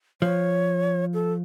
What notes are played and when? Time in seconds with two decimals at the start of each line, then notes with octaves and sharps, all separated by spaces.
0.22 F3 C#5
1.14 A4